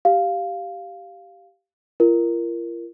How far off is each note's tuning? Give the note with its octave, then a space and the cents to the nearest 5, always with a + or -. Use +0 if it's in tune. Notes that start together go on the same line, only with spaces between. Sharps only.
G4 -10 F5 +0
F4 -40 A#4 +0